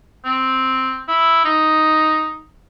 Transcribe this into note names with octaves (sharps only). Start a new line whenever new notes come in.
C4
E4
D#4